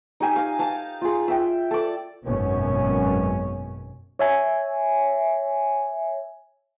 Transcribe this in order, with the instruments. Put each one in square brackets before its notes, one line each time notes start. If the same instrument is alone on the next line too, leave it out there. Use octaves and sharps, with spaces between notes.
[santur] D#4 G4 G#5
F5
F5 A5
F4 G#4
E5 G5
A4 D5
[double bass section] G#1 F#2 B2 C#4
[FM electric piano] C#5 E5 G#5